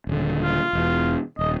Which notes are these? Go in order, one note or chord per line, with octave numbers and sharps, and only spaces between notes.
D#1 D3
F4
E1 E2
D#1 D#5